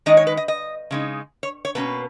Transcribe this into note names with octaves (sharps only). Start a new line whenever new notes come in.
D#3 G#3 D#4 D#5
C#5
B4
D#5
D#5
C#3 G#3 D#4
C#5
C#5
B2 A#3 C#4 B4